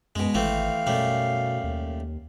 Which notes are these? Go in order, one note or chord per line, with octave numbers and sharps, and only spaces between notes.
F#2 B2 G#3
G#1 E3 A3 C4 F5
F#2 B2 G3 A3
D#2